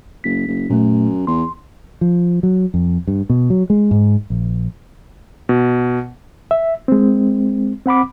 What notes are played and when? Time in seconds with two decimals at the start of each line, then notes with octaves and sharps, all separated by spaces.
0.24 F#1 B6
0.48 F#1
0.70 F#2 A#2 A3
1.27 E2 C6
2.01 F3
2.43 F#3
2.74 F2
3.07 G2
3.30 B2
3.50 F#3
3.70 G#3
3.91 G#2
4.30 A#1
5.49 B2
6.51 E5
6.88 G#3 C4
7.86 C4 F#5 B5 D6